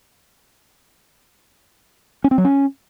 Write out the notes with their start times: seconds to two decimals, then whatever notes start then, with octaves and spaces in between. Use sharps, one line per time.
2.24 C#4
2.31 C4
2.38 F#3
2.45 C#4